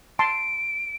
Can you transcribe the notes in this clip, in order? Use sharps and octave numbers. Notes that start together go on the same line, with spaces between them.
A5 C6 D7